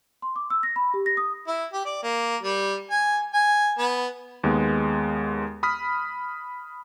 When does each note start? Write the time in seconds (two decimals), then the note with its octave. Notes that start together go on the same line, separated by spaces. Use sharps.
0.22 C6
0.36 D6
0.50 E6
0.63 A#6
0.76 B5
0.94 G4
1.06 A#6
1.17 D#6
1.48 E4
1.73 G4
1.85 D5
2.03 A#3
2.43 G3
2.91 G#5
3.34 G#5
3.79 B3
4.44 D#2 G#3 B3
5.63 B5 D#6 F6 B6